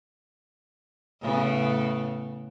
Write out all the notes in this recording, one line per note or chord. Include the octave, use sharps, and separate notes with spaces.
A2 C#3 B3